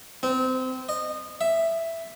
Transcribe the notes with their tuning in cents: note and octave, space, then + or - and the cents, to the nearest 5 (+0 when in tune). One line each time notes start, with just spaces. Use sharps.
C4 -25
D#5 -25
E5 +5